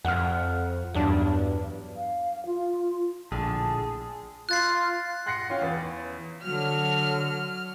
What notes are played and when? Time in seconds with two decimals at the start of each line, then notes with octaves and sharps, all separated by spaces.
0.05 F2 F#5 F6
0.94 E2 G2 F#3 D4
1.96 F5
2.46 F4
3.32 A#1 A2 D3 G#4 A5
4.49 F4 F#6 A6 C7
5.26 F#5 C6 F#6 A#6 C7 C#7
5.50 C#4 F4 F5 G5
5.62 E2 B4 A6
6.43 D3 F#3 F6